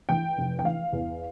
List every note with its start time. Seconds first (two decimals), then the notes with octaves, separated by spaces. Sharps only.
0.09 E3 G5
0.37 F1
0.59 G5
0.64 E3 F5
0.93 E2